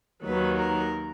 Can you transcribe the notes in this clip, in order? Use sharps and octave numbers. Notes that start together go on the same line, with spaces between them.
D#2 D#3 F#3 B4
A#4